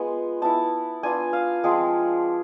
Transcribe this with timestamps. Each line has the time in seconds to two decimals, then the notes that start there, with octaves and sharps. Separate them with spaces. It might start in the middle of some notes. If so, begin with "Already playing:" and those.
Already playing: G#3 B3 F4 G#5
0.42 B3 E4 A5
1.03 B3 D4 F4 G#5
1.33 F5
1.64 F3 G#3 C4 G#4